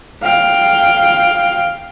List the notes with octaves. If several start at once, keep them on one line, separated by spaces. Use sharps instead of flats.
F5 G5